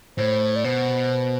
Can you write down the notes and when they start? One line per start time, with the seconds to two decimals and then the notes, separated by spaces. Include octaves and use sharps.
0.18 A2 C5
0.56 D5
0.64 B2 C5